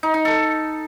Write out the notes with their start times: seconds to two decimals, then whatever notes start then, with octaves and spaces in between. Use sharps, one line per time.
0.03 D#4
0.14 D#4
0.25 A4